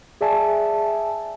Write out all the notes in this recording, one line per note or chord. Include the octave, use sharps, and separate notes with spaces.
G#4 D5 E5 G#5 A5